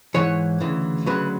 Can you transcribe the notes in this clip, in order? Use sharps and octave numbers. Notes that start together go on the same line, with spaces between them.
G#2 E3 C#5
D2 C#3 E3
D2 C#3 F#3 B4